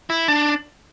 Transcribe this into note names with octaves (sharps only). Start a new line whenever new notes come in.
E4
D4